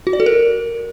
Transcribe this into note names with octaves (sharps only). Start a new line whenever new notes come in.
F#4
D5
A4
A#4